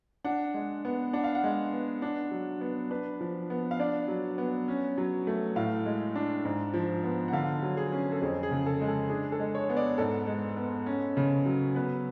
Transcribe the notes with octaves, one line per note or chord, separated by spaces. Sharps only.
D4 F#5
G#3
B3
D4 F#5
F5
F#5
G#3
B3
D4
F#3
B3
D4 B4
F3
B3
F5
D4 D5
F#3
B3
C#4
F#3
A3
A2 F5
G#3
D4
G#2
F3
B3
F#5
D3 F5
F#3
G#4
C#4
A4
F2 G#4
G#4
C#3
A4
G#3
A4
D4 G#4
A4
G#3
C#5
B3
D5
G#2 A4
G#3
B3
C#4
C#3
F#3
B3 B4